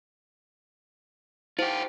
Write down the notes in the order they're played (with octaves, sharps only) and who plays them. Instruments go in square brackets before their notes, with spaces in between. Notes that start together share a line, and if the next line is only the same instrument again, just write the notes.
[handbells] E4 C5 [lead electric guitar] F4 G4